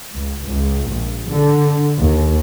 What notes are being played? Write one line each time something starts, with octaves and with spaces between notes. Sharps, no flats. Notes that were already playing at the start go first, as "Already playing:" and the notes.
C#2
C#2
A#1
D3
D#2